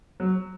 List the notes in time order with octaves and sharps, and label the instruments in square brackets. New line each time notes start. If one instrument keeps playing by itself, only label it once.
[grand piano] F#3